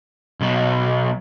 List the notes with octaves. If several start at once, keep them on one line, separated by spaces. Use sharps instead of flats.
B1 B2